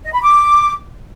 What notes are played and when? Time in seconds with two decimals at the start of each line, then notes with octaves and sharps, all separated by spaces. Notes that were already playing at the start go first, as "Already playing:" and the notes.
0.05 D#5
0.14 B5
0.22 D6